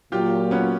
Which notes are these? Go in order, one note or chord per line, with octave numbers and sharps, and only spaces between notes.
A#2 F#3 A#3 F4 G4
B3 C#4